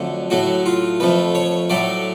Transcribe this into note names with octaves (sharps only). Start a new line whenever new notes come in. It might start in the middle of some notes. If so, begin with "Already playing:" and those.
Already playing: F2 D3 F#3 A3
A2 F#3 A3 F#4
F4
F2 F3 A3 B4
C#5
A2 F#3 A3 D5